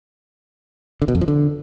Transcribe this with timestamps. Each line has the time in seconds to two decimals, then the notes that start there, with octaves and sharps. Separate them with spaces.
1.02 D3
1.08 B2
1.15 F2
1.21 F3
1.28 D3